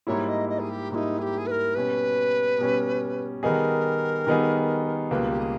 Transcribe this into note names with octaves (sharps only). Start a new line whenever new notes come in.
G#2 G3 A#3 E4 C#5
D#5
D#5
G#4
G4
G#2 G3 A#3 D#4 E4 G4
G#4
G4
G#4
B4
A#4
B2 G3 C#4 B4
B2 G3 C#4
D#3 G3 B3 D#4 G#4 A#4
D#3 G3 B3 D#4 G#4
C#2 B2 G3 A#3 B4
G4
G#4